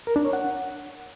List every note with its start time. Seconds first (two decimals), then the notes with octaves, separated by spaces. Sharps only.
0.07 A#4
0.16 D4
0.25 C#5
0.33 F#5